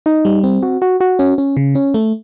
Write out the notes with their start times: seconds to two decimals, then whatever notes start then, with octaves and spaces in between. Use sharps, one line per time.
0.06 D#4
0.25 G3
0.44 C4
0.63 F#4
0.82 F#4
1.00 F#4
1.19 C#4
1.38 C#4
1.57 C#3
1.75 C#4
1.94 A3